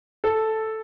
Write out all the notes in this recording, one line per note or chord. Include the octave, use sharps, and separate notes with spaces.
A4